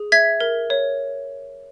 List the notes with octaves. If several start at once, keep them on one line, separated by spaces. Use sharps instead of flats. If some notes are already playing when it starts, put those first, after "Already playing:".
Already playing: G#4
E5 G#6 B6
A#4
C#5